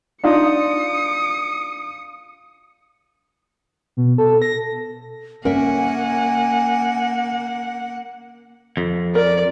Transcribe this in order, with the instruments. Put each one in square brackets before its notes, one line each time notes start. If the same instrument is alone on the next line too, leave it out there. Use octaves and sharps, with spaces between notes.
[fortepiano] D4 D#4 F4 [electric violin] D#6 C#7
[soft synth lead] B2
A4
A#6
[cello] A#3 F#5 [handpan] C#4 [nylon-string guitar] A#4 E5 [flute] G#5
[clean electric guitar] F2
[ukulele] A#4 [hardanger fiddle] D5